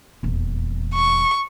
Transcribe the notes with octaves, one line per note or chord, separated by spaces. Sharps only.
D#1 E2
C#6